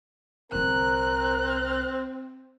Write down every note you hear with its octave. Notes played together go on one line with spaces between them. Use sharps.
C2 D3 C4 A#4 F#6